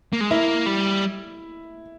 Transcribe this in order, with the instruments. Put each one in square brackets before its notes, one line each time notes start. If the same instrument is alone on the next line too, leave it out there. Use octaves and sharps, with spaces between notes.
[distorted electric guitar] A#3
G#3
[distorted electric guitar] A#3 [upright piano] E4
[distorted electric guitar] G3